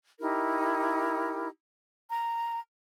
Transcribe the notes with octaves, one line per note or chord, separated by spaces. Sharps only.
D#4 E4 G4 A#4
A#5